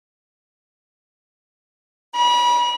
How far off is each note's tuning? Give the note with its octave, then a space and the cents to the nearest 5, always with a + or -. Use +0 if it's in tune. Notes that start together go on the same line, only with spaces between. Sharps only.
B5 -35